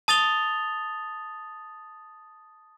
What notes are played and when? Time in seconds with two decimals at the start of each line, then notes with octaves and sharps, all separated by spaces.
0.08 A5 D#6 A6 F7 G7